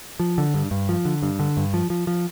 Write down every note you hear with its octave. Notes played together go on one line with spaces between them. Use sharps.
F3
D3
G2
G2
F3
D3
G2
D3
G2
F3
F3
F3